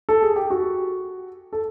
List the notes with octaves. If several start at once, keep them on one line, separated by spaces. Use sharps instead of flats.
A4
G#4
G4
F#4
A4